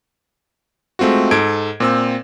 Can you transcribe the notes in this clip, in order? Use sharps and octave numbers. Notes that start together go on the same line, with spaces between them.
G#3 A3 C4 F4 F#4
G#2 A4 G#6 D7
A#2 C4 E6